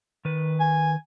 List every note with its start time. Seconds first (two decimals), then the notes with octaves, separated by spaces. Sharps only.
0.25 D#3 B4
0.60 G#5